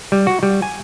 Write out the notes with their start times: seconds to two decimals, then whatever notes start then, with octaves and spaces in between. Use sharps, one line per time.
0.12 G3
0.27 F#4
0.43 G3
0.62 G#5